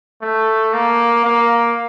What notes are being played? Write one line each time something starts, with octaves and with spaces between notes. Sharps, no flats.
A3
A#3
A#3